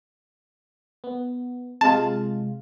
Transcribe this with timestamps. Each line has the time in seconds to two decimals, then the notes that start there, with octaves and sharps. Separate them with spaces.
1.04 B3
1.81 C3 G#3 F4 A5